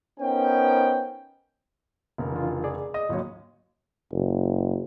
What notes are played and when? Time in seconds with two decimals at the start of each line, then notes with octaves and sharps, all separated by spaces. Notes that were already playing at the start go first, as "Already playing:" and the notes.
0.20 B3 C#4 D#4 A#4 C5 G5
2.18 F1 C#3 A#4
2.32 E3 D4 F4
2.64 G#4 D5
2.94 D#5 D#6
3.09 G#1 D#2 D3 F#3 C#5
4.12 F#1